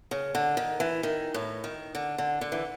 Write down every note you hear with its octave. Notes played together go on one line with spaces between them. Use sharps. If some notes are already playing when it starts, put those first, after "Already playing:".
C#3
D3
D#3
E3
D#3
A2
D#3
D3
D3
D3
E3